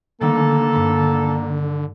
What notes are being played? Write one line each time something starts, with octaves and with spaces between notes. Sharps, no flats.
D3 D#3 G3 A3 A#3 A4
G2 B5